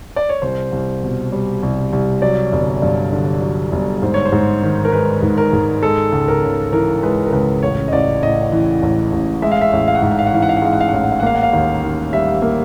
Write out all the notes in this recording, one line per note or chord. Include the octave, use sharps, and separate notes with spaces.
D5
C#5
C2 C5
C2
B2
G3
C2
C2
F#3 D5
G1
G2
D3
F#3
G1
G#2 C5
C#5
C5
G#2
D#3
A#4
G#3 B4
G#2
A#4
G#2
G#3 A4
C#2
A#4
C#3
E3 A#4
G#3 B4
A#4
C#2 B4
A1 C#5
D#5
A1 D5
A2 D#5
E3
A1
A1
G#3 E5
F5
E5
A1
F5
F#5
G#2 F5
F#5
F5
F#5
E3 F5
F#5
F5
F#5
G#3 F5
F#5
F5
F#5
A1 F5
F#5
F5
F#5
A#3 F5
F#5
F5
D#2
D#3
G3 E5
A#3